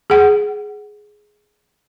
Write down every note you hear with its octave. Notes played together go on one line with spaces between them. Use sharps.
G#4 F#5